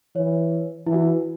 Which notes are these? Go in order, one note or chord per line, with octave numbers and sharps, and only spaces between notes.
E3 C#5
E3 E4
F#4
E4